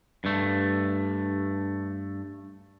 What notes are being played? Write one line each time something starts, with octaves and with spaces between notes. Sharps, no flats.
G2 A3